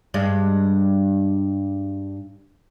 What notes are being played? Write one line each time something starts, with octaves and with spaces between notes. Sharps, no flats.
G2 G#3